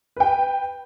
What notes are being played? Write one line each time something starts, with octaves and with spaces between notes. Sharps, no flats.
B4 G5